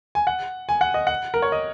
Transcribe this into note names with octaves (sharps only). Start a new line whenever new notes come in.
G#5
F#5
G#5
F#5
D#5
F#5
A#4
C#5
D#5